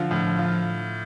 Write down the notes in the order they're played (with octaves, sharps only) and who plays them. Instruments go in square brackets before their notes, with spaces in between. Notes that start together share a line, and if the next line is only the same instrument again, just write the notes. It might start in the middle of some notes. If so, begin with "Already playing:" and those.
Already playing: [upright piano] D3 F4 [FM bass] F3
[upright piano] A2
F4